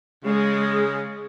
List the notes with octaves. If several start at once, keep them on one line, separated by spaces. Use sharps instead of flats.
C#3 G#3